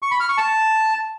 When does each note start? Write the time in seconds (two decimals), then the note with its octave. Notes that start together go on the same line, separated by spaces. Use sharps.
0.02 C#6
0.11 B5
0.20 F6
0.29 C#6
0.38 A5